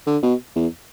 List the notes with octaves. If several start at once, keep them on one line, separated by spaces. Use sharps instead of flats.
D3
B2
E2